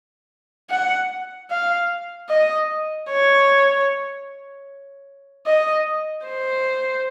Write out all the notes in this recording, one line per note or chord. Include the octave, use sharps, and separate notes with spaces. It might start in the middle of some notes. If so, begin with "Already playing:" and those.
F#5
F5
D#5
C#5
D#5
C5